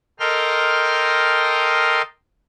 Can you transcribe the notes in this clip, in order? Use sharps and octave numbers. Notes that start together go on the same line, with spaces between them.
A4 A#4 D#5 G5 C6 F6